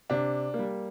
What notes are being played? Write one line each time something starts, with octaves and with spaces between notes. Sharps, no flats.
C3 D4
A#3
G3